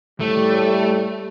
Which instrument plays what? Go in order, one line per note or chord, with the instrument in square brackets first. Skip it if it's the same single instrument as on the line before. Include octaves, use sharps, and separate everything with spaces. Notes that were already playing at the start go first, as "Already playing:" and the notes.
[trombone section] A2 G3 [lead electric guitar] A3